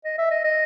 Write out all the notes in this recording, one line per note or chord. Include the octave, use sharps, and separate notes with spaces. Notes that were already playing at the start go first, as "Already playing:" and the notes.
D#5
E5
D#5
D#5